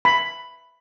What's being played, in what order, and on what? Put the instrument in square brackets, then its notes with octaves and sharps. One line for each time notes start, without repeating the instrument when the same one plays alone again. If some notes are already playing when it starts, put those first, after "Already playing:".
[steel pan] B5